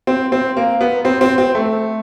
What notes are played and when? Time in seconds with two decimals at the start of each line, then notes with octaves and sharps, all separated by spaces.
0.07 C4
0.32 C4
0.57 A#3
0.81 B3
1.05 C4
1.21 C4
1.38 C4
1.55 A3